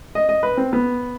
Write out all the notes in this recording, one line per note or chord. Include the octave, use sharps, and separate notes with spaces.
D#5
D#5
B4
C4
B3